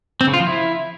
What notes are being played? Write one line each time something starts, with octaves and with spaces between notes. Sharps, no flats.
C4
C#3
F4
F3
E4